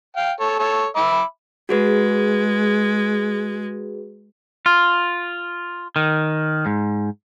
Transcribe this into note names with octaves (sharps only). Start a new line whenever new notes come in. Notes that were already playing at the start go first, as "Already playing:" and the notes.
F5 G5
A4 C#5
A4 C#5
E5 B5 D6
G#3 F#4 G#4 B4
F4
D#3
G#2